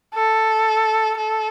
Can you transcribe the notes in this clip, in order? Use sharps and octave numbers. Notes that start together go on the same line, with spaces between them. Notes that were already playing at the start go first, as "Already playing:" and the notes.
A4
A4